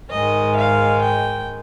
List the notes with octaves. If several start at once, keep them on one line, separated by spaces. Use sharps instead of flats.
G#2 D#3 G#3 D#5
F5
G5